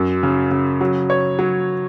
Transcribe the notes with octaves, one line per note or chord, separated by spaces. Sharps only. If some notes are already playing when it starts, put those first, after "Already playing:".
Already playing: F#2
C#3
C#3
F#3
C#5
F#3